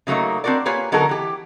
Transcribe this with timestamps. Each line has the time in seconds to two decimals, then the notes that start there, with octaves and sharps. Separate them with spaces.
0.07 C#3 F#3 A3 A#3 D#4
0.44 C4 D4 F#4 A#4 D5
0.65 A#3 F4 G4 B4 C#5 G#5
0.92 D3 F#3 B3 D#4 A4 A#4
1.09 E3 G4